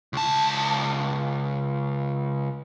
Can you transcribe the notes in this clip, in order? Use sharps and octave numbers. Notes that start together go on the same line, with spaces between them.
C#2 A5